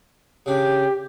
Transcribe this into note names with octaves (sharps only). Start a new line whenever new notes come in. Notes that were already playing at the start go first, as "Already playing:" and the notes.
C#3 D4 G4